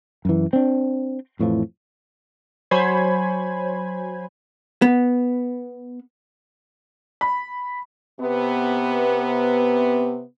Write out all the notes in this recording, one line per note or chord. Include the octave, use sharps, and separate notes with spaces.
F#2 E3
C4 D4
F2 A2 E3 F3
F#3 C5 C#5 G#5 B5 G#6
B3
B5
C3 B3